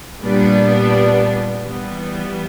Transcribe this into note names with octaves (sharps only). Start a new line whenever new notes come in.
A#2 G3 B3 D4
E3 G3 B3